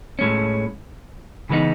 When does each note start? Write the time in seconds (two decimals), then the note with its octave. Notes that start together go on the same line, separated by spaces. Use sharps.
0.19 A2 G#3 C#4
1.49 C#3 E3 G#3 B3 D#4